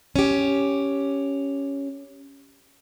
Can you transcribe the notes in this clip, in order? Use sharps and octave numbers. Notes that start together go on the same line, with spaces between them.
C#4 G4